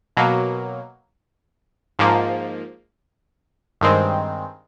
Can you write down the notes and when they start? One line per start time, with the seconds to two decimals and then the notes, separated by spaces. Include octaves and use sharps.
0.17 B2 F#3 A#3
1.99 G#2 F3 A#3
3.81 G2 D#3 G#3 C4